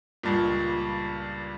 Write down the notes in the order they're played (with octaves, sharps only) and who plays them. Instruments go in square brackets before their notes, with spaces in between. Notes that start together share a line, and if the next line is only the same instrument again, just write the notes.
[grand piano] C#2 G2 A#2